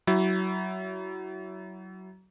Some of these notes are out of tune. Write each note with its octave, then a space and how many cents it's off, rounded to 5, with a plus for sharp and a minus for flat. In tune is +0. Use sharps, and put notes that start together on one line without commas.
F#3 +25 E4 +5